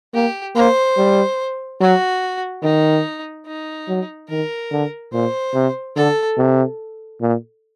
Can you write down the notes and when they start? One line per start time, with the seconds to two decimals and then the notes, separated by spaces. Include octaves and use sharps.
0.14 A#3 G4
0.55 A#3 C5
0.97 G3
1.81 F#3 F#4
2.63 D#3 D#4
3.46 D#4
3.88 F#3
4.29 D#3 A#4
4.71 D3
5.12 A#2 C5
5.54 C3
5.96 D3 A4
6.37 C3
7.21 A#2